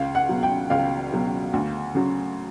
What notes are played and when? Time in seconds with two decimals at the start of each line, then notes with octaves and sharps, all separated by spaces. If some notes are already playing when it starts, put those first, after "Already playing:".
Already playing: C#2 F5
0.15 F#5
0.29 B2 F#3
0.43 G5
0.70 C#2 F5
1.12 B2 F#3
1.53 D2
1.95 C#3 F#3